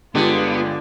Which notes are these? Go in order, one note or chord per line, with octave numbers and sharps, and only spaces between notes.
G1 D3 G#3 B3 F4 G4